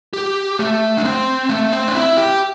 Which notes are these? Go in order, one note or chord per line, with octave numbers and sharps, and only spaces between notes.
G4
A3
D4
C4
A3
C4
D4
E4
G4